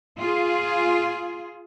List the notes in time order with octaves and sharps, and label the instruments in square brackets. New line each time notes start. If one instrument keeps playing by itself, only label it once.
[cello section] F4 G#4